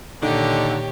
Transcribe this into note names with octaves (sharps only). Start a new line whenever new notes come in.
A#2 D3 D#3 D#4 G4 C#5